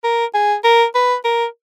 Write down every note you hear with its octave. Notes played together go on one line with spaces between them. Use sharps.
A#4
G#4
A#4
B4
A#4